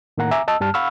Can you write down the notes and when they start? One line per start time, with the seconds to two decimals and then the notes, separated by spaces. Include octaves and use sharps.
0.18 A2 D#3 A#3 F#5 A#5
0.31 E5 G#5 A#5 D6
0.48 D#5 A5 E6
0.60 G2 G3 A5 F6
0.74 F5 F#5 B5 C#6 E6 F6